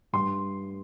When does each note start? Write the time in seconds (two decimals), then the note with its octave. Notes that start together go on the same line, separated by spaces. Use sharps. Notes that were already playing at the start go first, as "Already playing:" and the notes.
0.13 G2 C6